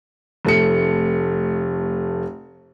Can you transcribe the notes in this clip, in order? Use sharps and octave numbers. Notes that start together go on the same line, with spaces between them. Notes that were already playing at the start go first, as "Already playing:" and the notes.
F1 A3 C#7